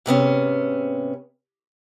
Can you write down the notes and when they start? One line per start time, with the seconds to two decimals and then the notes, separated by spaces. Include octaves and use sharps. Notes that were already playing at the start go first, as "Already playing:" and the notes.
0.06 G#2 C3 B3 C#4